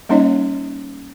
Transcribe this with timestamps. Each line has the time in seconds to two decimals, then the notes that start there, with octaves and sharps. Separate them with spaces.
0.09 G3 A#3 C#4 D#4 C#5 D#5